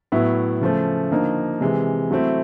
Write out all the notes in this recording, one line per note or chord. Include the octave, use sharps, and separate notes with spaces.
A2 F#3 B3 E4
C#3 F3 A3
D3 F3 A#3 D#4
C3 E3 G#3
F#3 A3 C4 E4